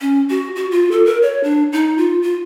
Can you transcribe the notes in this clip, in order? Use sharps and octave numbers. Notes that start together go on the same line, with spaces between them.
C#4
F#4
F#4
F4
A4
A#4
C#5
D4
D#4
F4
F4